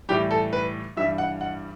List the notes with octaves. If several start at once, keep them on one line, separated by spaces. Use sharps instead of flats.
A2 E3 G3 G4
A4
B4
G2 E3 G3 E5
F#5
F#5